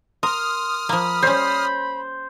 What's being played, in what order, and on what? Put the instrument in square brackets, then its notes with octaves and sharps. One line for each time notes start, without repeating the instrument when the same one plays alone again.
[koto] A#4 [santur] C6 [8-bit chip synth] D#6 F6
[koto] F3 A#3 [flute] B5
[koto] G3 C#4 [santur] C5